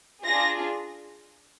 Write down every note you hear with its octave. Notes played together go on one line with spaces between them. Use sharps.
D4 F4 G#4 A#6